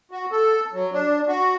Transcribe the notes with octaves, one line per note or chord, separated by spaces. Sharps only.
F#4
A4
F#3
D4
F#4